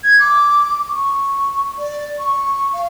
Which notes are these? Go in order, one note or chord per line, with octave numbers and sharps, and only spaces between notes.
G#6
D6
C#6
D5
C#6
F5